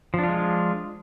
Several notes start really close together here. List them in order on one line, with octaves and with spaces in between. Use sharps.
F3 D4 F4 G#3